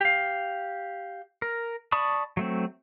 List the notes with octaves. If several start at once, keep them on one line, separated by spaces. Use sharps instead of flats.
G4 F5
A#4
D5 A5 B5 C#6 D#6
F#3 A3 C4